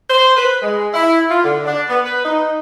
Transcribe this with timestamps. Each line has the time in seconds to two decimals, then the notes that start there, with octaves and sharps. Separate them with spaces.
0.09 C5
0.37 B4
0.62 G#3
0.93 E4
1.29 F4
1.45 D3
1.65 D4
1.88 B3
2.04 B4
2.24 D#4